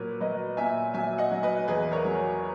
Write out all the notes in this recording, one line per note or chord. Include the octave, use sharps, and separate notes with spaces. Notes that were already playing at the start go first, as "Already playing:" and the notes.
Already playing: A#2 F#3 A#4 B4 C#5
F#3 B4 D#5
A#2 E5 G#5
F#3 E5 G#5
D#5 F#5
F#3
B4 D#5
E2 G#4 B4
A#4 C#5
F#3